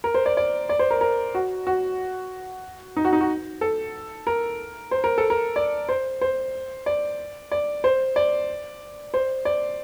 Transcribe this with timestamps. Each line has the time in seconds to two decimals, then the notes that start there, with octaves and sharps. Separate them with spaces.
0.04 A#4
0.14 C5
0.26 D5
0.37 D5
0.69 D5
0.79 C5
0.91 A#4
1.01 A#4
1.35 F#4
1.67 F#4
2.97 D#4
3.05 F#4
3.13 D#4
3.21 F#4
3.61 A4
4.27 A#4
4.91 C5
5.04 A#4
5.18 A4
5.30 A#4
5.56 D5
5.89 C5
6.21 C5
6.86 D5
7.52 D5
7.84 C5
8.16 D5
9.14 C5
9.45 D5